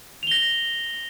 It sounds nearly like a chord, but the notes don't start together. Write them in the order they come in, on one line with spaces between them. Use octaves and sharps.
F7 G7 A#6